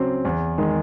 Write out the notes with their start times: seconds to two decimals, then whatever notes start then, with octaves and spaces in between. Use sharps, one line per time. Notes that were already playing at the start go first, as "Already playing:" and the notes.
Already playing: C#3 F#3 C4
0.25 E2
0.58 D#3 G#3